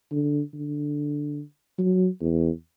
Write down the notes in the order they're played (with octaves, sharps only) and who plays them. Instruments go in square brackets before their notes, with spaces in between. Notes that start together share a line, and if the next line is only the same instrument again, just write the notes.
[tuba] D3
D3
F#3
E2